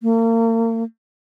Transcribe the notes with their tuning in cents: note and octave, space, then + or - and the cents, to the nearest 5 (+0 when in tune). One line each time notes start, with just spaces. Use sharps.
A#3 -35